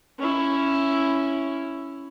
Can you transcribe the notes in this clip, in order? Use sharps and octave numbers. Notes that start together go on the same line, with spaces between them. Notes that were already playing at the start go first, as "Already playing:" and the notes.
C#4 E4